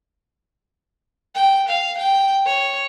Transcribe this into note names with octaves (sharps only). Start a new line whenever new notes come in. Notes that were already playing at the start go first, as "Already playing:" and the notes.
G5
F5
G5
C#5